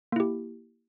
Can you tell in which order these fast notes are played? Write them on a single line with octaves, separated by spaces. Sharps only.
A#3 E4 G4